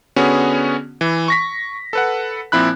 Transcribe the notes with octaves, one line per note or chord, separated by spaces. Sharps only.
D3 B3 C#4 F#4 G#4
E3
C#6 A#6 B6
A4 B4 F#5
A#2 F3 C4 E4 B5 F#6